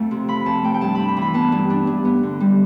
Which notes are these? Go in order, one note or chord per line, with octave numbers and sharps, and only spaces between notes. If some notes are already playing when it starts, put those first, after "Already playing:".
Already playing: F2 A3
C3
F3 B5
F2 A5
A3 G5
G5
G2 A5
D4 B5
B5
E3
B5
B3 A5
G2
D4
G2
B3
D3
G3